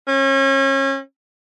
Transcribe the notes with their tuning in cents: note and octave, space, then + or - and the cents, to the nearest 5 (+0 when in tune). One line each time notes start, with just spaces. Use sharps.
C#4 -35